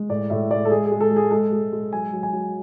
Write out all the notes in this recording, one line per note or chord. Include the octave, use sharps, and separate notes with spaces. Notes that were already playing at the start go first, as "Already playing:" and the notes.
Already playing: G#3
A2 D5
A2 E5
G#3 D5
A4
G#3 G#4
G#4
G#3
A4
G#3
G#4
G#3 A4
G#3
G#3
F#3 G#5
F#3
G#5
F#3